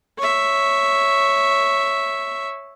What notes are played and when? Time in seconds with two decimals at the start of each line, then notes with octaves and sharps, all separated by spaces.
0.19 C#5 E5